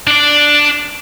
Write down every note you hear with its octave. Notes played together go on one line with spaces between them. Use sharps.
D4 D5